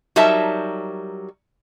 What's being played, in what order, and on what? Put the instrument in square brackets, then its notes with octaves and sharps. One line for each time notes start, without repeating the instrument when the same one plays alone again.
[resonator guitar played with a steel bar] F#3 G3 D#4 A#4 E5 A5